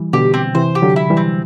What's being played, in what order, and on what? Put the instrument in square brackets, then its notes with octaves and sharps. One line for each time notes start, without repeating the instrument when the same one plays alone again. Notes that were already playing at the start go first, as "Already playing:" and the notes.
Already playing: [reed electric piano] E3 G3
[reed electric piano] B2 D3 [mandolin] G4
[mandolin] C4
[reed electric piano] C3 E3 [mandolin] C5
[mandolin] G4
[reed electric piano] D3 F#3
[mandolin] E4
[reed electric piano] E3 G3
[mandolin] C4